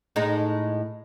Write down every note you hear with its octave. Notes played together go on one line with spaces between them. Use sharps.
A2 G#3 D#4